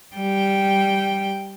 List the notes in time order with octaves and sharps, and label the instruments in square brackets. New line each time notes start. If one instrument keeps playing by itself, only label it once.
[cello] G3 G5